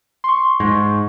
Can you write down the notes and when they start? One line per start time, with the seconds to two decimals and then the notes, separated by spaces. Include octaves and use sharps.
0.24 C6 C#6
0.60 G#2